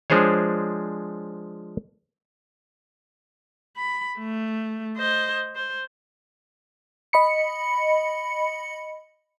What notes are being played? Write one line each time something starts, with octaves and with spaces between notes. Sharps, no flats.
F3 G#3 D4 G#4 C5 C#5
B5
A3
C5 D#5
C5
D#5 B5 C#7